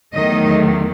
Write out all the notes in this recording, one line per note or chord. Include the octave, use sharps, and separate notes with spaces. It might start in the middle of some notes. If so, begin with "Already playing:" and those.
E2 D#3 F#3 A3 D#5